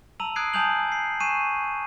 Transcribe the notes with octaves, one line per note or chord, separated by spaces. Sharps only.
A5 A#5 E6 D#7 F7 F#7
D#6 F#6 G#6 C7 D7
G#5 A5 D#6 G6 F7 F#7
C7
G#5 C#6 F#6 C7 D#7 E7